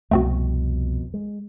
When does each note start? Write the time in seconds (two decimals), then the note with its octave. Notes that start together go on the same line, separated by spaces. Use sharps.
0.11 C2 F2 B2 A3 C4 F#4
1.14 G#3